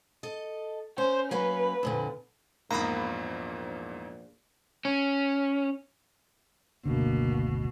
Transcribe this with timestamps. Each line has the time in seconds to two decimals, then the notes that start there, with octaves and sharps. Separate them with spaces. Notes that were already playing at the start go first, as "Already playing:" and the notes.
0.23 A4 D#5
0.98 C#4 C5
1.31 F#3 A#3 C#4 B4
1.83 F2 A#2 D3
2.71 A#1 E2 G#2 A#3 A#5 B5 D#6
4.85 C#4
6.86 F#1 D2 B2 D3 A#3